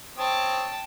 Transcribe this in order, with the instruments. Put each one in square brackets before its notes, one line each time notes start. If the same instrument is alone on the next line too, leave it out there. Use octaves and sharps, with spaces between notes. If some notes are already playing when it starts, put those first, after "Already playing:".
[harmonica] C4 C#5 D#6 [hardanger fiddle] G5 A5